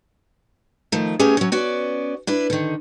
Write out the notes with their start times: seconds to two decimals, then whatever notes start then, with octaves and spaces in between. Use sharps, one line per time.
0.92 D#3 F3 A3
1.19 A3 B3 C#4 G4 G#4
1.37 F#3 C#4
1.52 B3 C#4 F#4 D5
2.27 D4 E4 B4
2.50 D3 D#3